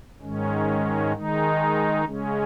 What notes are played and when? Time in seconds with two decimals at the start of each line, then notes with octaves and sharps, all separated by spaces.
0.22 G#2 D#3 G#3 C#4
1.14 D#3 G#3 D#4
2.04 C#3 G#3 C#4